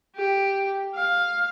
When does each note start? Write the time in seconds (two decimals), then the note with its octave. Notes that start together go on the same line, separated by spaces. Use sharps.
0.16 G4
0.95 F5